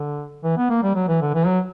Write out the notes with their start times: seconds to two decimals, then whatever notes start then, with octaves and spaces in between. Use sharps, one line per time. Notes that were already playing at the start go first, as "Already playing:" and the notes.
Already playing: D3
0.44 E3
0.57 B3
0.70 A#3
0.83 G3
0.95 F#3
1.08 E3
1.22 D3
1.34 E3
1.47 F#3